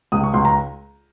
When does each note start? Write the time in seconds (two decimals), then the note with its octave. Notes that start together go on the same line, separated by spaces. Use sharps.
0.12 C#2 D#6
0.24 C#6
0.34 C#2 C6
0.45 A#5